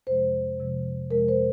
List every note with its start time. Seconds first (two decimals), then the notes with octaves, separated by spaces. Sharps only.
0.07 F2 C3 F3 G#3 C5
0.59 F2 C3 F3 G#3
1.11 F2 C3 F3 G#3 A#4
1.28 C5